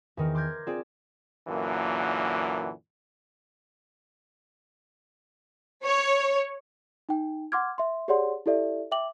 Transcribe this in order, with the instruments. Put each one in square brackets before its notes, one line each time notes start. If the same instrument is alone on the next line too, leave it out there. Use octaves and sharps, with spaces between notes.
[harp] E2 D#3 A#4
C6 D6 F6 G6 G#6 A#6
C4 F4 G#4 D5
[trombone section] F#2 A#2 D3 E3 A#3
[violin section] C#5
[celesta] D#4 G5
F#5 C6 D6 F6 G#6
E5 C6
G4 G#4 C#5 D5 F#5 C6
E4 G4 A4 D5 E5
E5 G5 D6 F#7